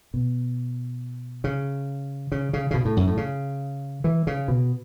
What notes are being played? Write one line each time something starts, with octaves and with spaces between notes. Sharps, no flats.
B2
C#3
C#3
C#3
C#3
B2
A2
F#2
A2
C#3
E3
C#3
B2